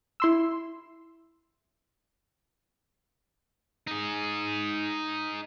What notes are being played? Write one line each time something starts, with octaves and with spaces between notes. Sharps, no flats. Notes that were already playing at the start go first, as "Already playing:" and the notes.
E4 C6 E6
D#4 G#4